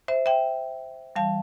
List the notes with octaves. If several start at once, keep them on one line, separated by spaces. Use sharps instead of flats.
C5 E5
E5 G5
E3 G3 F5 A5